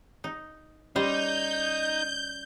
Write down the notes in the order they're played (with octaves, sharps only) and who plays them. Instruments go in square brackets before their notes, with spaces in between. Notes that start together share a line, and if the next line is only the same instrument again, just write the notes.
[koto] D#4
[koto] G3 C5 [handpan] C#4 D5 [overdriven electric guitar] D#4 [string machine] G6